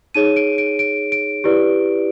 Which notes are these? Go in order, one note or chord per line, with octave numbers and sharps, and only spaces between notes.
D#4 G#4 C#5 D#7
D7
D7
D7
D7
E4 G4 B4 D5